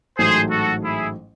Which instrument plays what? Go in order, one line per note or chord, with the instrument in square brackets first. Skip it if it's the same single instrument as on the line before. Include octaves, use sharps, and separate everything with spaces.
[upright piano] A1 G#2 F#3 A3 [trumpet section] G#4 C5
[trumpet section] F#4 A4
E4 G#4